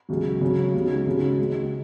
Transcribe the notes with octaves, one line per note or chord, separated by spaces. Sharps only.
C#2 C#3 F#3
C#3 F#3 C#4
C#2 C#3 F#3 D#4
D#2 C#3 G#3 C#4 F#4
C#2 C#3 G#3